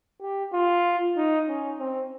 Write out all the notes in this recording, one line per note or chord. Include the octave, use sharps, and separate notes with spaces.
G4
F4
D#4
C#4
C4